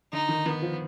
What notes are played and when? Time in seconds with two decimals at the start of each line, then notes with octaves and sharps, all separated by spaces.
0.13 D3 D#4
0.29 D#3
0.45 D#3 B3
0.62 F3